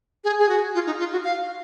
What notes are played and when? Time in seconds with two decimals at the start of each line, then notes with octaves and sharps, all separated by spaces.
0.24 G#4
0.39 G#4
0.49 F#4
0.75 F4
0.86 D#4
0.99 F4
1.12 F#4
1.24 F5